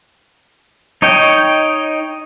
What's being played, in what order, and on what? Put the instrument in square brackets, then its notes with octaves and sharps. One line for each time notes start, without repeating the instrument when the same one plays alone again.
[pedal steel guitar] D#4 C#5 D#5 G5